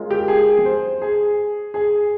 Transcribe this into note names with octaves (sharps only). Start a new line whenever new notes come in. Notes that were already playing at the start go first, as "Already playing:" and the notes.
Already playing: G#3 C#4 F4 A#4
G4
G#4
C5
G#4
G#4